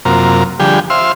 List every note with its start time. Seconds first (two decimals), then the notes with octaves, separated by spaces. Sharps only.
0.05 F#2 C3 A#3 F4 A#4
0.60 D3 F3 G3 G4 G#4
0.90 C5 E5 F5 C6